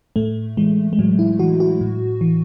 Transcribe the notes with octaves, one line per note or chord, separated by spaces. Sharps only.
A2 A3
E3 G#3
G#3
A2 F#3
E4
E3 F#4
F#4
A2
E3